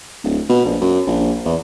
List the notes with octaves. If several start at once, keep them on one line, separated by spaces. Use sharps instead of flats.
D1
B2
A#1
F#2
A#1
E2